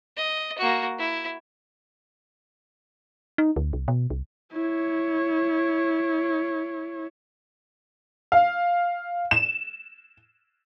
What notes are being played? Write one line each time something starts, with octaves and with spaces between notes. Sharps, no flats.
D#5
A#3 F#4
E4
D#4
D2
C2
B2
C2
E4 C#5
F5
E7